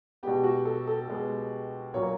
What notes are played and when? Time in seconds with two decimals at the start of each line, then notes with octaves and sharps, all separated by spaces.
0.23 B2 G#3 B3 G4
0.44 F#4
0.65 A4
0.87 A4
1.08 B2 G#3 B3
1.94 A#2 F#3 A#3 C#5